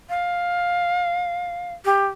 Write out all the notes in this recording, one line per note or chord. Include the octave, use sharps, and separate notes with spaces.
F5
G4